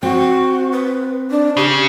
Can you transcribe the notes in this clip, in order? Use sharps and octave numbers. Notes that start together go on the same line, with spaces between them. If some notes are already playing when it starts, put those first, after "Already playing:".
C4 F#4
B4
D4
C#3 G4